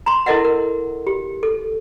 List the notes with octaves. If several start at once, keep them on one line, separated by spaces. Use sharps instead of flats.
A#5 C6
E4 A4 A#4 D#5 E5 F#5
A#4
G4
A4